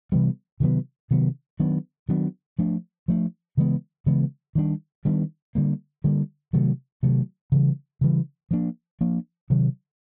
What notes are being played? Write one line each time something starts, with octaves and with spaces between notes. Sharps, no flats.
C3 E3 G3 B3
C3 D#3 F#3 B3
C3 D#3 F#3 B3
D#3 F#3 B3 D4
D#3 F#3 B3 D4
F3 A3 D4
F3 A3 D4
C#3 E3 G#3 B3
C#3 E3 G#3 B3
D#3 G3 B3 D4
D#3 G3 B3 D4
D3 G3 A#3
D3 G3 A#3
C3 D#3 F#3 A3
C3 D#3 F#3 A3
C#3 E3 G3
C#3 E3 G3
F3 A#3 D4
F3 A#3 D4
C3 D#3 F#3